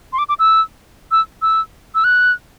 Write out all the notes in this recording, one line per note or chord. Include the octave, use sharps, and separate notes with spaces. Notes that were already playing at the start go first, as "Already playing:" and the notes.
C6
D6
D6
E6
E6
E6
E6
F#6